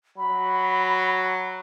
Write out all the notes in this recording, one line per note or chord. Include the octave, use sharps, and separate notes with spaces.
F#3 B5